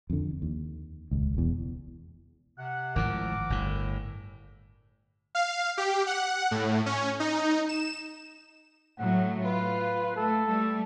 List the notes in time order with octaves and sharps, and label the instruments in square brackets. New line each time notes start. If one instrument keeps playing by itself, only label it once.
[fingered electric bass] F2 D3
D#2
D#1 C#2
E1 E2
[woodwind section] C3 F#5
[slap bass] G#1 A2 F3 [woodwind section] A#4 F#5 D6
[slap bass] G1 A2
[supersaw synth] F5
G4
F#5
A2
C#4
D#4
E7
[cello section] A2 F#3 A3 [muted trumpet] F#5
[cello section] F4 [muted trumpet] B4
[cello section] A3 [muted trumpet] A4
[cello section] G3 A3